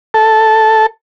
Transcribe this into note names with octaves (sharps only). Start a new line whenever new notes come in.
A4